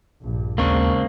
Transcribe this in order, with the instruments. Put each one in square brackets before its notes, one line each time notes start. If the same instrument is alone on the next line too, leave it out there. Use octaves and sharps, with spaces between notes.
[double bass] A#1 G2
[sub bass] D#2 [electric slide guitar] C#3 C4 D4 [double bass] G#3 [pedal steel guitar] A#3 C#6